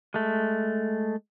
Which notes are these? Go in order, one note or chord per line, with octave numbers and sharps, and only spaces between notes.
G#3 A3